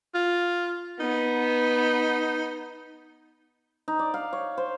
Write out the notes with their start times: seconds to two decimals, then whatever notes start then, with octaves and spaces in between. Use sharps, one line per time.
0.15 F4
1.00 B3 D#4
3.88 D#4
3.99 D5
4.14 F5
4.33 C#5
4.58 C5